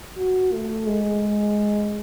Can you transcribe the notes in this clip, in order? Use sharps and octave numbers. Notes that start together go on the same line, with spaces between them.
F#4
A3
G#3